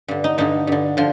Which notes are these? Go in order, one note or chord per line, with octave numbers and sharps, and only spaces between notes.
G2 D3
D#4
G2 D3 D#4
G2 D3
D3 F3